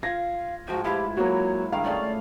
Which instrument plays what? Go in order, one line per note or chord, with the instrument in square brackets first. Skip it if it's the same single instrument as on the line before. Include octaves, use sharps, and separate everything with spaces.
[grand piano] F4 G#6 A#6 [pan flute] F5
[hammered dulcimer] G#2 F3 G5 [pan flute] F#4
[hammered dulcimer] E4 F4 B4 [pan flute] G4
[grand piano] F#3 A#3 F#4 [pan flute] C#5
[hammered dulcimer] G2 D#3 G#4 [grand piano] F5
[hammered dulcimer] A3 C#4 G#4 [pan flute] D5